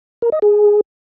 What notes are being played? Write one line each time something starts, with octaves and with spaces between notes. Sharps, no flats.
A#4
D#5
G#4